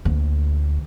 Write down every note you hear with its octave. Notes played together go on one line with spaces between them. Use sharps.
D2 A#3